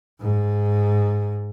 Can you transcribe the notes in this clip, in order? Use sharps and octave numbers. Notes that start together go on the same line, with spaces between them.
G#2